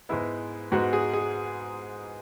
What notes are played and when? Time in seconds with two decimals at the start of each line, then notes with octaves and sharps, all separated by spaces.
0.09 G#2 G#3 B3 E4
0.72 G#2 G#3 B3 F#4
0.93 G#4
1.13 G#4